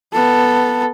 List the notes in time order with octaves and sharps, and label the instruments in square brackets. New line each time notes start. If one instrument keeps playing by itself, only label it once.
[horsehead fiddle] B3 A4